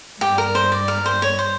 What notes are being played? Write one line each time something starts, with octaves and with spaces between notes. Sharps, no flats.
G2 G4
A#4
C5
D5
A#4
C5
C#5
C5